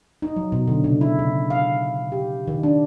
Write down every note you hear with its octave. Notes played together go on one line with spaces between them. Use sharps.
D#4
F#3
B2
D3
C#3
E4
C#3
F5
G4
D#3
D4